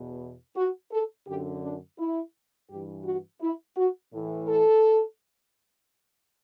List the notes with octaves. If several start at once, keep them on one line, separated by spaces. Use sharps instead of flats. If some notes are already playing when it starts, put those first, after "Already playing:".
Already playing: E2 B2
F#4
A4
F#2 D3 G4
D4
E4
G2 E3 G4
F#4
E4
F#4
A2 E3
A4